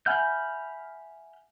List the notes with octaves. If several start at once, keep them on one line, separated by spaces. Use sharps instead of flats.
E5 F#5 G#5 B5 F6 G6